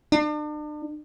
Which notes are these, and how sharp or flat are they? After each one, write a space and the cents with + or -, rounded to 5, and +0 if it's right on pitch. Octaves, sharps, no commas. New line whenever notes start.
D4 +40